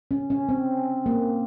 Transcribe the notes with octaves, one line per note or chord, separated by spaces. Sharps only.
C#4
C#4
C4
A#3